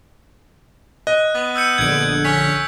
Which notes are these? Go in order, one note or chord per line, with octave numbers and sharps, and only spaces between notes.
D#5 F#6
B3
E6 G6 C#7 D#7
A#1 D3 G#6 D7
C#4 B6